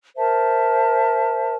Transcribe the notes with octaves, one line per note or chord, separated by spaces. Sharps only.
A#4 C5 E5 A5